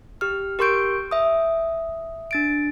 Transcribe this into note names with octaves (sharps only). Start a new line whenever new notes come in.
G4 F6
G4 A#4 C6 C#6 G6 D7
E5 D#6
D4 A6 D7